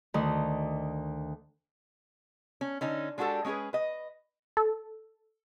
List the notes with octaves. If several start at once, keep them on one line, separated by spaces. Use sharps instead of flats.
D2 D#3
C#4
D3 C#4 D#4
G#3 D4 F#4 G4 A4
G#3 C#4 G4 G#4 B4
B4 D#5
A4